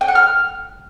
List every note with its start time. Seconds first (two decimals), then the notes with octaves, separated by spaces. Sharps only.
0.01 G5
0.08 F#5
0.15 F6